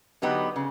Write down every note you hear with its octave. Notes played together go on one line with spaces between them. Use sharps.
D3 F#3 B3 D#4 G4
C#3